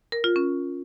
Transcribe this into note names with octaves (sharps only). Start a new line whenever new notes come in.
A#4
F4
C#4